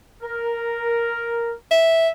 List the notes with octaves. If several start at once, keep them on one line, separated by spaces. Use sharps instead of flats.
A#4
E5